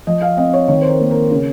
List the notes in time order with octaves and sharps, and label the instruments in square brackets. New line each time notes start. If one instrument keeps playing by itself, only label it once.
[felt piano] F3 D#5
F5
C4 D#5
C#5
D#3 C#5
C5
A#4
A#3
A#4
C#3